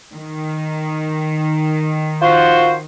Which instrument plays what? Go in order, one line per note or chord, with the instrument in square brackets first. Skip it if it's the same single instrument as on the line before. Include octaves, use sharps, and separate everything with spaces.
[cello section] D#3
[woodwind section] F4 F#4 C5